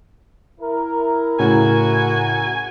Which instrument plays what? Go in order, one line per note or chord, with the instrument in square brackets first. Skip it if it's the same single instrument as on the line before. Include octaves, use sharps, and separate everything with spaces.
[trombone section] E4 A#4
[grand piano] A2 C#3 [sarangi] F#4 [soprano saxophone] G#5